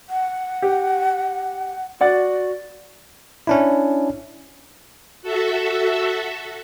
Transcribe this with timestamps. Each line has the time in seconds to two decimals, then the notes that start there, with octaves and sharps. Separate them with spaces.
0.10 F#5
0.62 G4
2.01 F#4 D5 F#5 A6
3.47 C#4 D4 E4
5.22 F#4 A4 E5